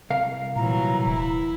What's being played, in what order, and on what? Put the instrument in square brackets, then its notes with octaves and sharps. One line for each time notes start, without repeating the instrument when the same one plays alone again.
[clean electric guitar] C2 A#4 F5
[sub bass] A#2 [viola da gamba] E3 F#3 [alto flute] A#5
[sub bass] D#1 [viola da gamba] E4